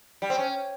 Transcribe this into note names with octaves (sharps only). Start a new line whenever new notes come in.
G3
C4
C#4